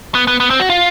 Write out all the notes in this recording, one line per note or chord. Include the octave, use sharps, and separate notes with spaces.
B3
B3
B3
C4
F#4
F4